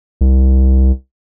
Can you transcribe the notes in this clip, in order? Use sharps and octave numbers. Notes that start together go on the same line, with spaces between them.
C2